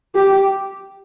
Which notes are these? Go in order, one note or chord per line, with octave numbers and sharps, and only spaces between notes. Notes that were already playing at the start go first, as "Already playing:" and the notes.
G4